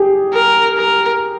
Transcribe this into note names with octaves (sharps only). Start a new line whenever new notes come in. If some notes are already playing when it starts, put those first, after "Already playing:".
Already playing: G4 G#4
A#4
A#4